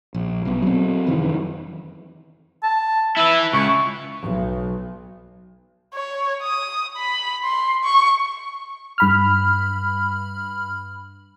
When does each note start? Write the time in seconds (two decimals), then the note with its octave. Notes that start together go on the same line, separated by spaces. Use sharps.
0.14 A#1
0.45 B1 B3
0.62 F#3 C4
1.07 F1 F#2 D#3 E3
2.63 A5
3.17 E4 B4 E5
3.53 C#2 C#6
4.21 B1
5.94 C#5
6.43 D#6
6.97 B5
7.45 C6
7.84 C#6
8.98 G2 B5 F6